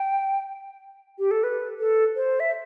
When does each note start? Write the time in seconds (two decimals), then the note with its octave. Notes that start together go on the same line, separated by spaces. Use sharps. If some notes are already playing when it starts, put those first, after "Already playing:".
Already playing: G5
1.19 G4
1.31 A4
1.44 B4
1.79 A4
2.16 C5
2.40 E5